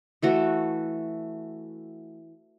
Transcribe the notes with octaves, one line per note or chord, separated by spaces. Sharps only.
E3 A3 F#4